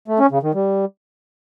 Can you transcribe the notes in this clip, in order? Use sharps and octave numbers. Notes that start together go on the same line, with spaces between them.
A3
C#4
C#3
D#3
G3